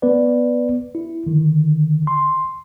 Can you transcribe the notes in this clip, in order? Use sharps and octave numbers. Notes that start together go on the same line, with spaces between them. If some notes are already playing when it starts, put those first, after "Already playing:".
B3 B4 D5
E4
D3 D#3
C6